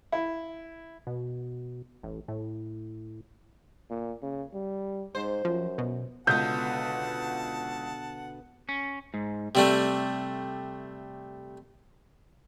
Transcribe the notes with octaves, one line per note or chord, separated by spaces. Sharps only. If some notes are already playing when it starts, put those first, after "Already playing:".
E4
B2
A1
A2
A#2
C#3
G3
G#2 C5
F#2 F3
B2
C#2 B2 D3 B3 F#5 A5 G6
C#4
G#2
C3 G3 A3